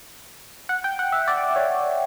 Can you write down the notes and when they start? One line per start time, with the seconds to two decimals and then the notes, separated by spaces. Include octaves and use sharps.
0.69 F#5
0.84 G5
0.99 F#5
1.12 E5
1.28 D5
1.56 C#5